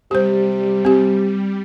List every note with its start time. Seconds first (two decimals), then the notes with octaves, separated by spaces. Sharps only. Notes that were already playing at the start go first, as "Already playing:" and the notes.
0.11 C3 G3 G4 C5
0.85 C4 G4